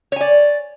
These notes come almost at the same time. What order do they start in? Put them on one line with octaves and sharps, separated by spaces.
C#5 G#5 D5